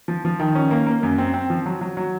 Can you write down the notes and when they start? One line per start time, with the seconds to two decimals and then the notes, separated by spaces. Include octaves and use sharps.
0.08 F3
0.25 F3
0.40 D#3
0.55 C#4
0.71 A#3
0.87 A#3
1.03 F#2
1.18 C4
1.34 C4
1.50 F3
1.66 F#3
1.81 F#3
1.97 F#3